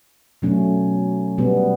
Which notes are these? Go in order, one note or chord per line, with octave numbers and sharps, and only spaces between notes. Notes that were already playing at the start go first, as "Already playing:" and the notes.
B2 F#3 A3 C#4
B2 G3 B3